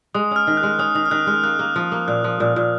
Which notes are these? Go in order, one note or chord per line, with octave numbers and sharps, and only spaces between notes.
G#3 D#6
C#4 F6
D#3
F#6
G#3
C#4 D#6
D#3 D#6
F6
D#3 F#6
G#3 F6
A#3 F#6
A#3
F3
A#3
A#2 F#6
F3
A#2
A#2